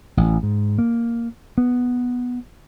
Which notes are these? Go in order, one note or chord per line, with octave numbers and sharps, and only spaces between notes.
A1
G#2
A#3
B3